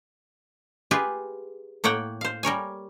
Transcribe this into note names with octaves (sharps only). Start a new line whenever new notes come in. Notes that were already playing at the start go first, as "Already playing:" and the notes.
F4 G4 G#4 B4
A2 A#3 C#5 F#5 G5
C5 F5
G3 A#4 C#5 G#5